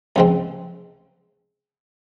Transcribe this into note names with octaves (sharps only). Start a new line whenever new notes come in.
C#2 C3 F3 G#3 C4